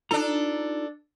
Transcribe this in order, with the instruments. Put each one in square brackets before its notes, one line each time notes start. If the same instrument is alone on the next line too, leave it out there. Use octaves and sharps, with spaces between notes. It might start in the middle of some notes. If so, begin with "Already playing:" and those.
[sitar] D4 A4 [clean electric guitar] D#4 F4 A#5